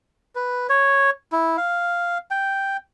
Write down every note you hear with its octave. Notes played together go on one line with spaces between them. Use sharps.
B4
C#5
E4
F5
G5